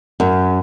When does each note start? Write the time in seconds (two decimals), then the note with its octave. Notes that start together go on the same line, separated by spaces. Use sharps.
0.20 F#2